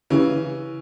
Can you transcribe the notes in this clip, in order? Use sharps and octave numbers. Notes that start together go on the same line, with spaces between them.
C#3 E3